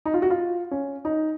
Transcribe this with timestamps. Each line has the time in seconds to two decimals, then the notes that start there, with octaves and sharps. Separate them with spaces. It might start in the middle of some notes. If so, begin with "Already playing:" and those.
0.05 D#4
0.14 F4
0.22 F#4
0.30 F4
0.71 C#4
1.05 D#4